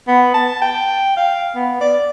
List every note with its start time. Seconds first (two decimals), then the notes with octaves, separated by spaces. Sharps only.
0.08 B3
0.34 A5
0.62 G5
1.17 F5
1.55 B3
1.81 D5